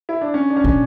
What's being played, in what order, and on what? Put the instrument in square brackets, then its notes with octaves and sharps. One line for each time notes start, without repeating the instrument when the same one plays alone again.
[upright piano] E4
D4
C#4
D4
C#4
[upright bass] A#2